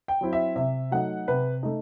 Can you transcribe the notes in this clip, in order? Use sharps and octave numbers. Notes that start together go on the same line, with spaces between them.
G5
F#3 C4 E4
E5
C3 E5
F#3 A3 D#4 F#5
C3 B4
A3 D#4